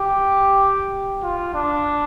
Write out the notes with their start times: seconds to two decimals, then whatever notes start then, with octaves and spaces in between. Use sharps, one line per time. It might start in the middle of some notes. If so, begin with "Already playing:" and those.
Already playing: G4
1.23 F4
1.55 D4